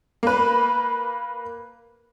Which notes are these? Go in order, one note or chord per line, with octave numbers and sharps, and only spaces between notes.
A#3 B4